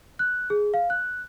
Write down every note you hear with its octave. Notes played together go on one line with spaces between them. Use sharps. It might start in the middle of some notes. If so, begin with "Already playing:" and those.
F#6
G#4
F5
F#6